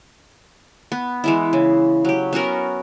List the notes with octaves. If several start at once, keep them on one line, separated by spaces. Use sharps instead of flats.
B3
E3 G#3 E4
C#3
F#3 G4
B3 C#4 F#4 A#4